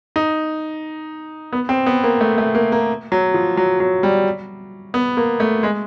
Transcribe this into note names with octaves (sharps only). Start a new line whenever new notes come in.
D#4
B3
C4
B3
A#3
A3
A3
A#3
A#3
F#3
F3
F#3
F#3
G3
B3
A#3
A3
G#3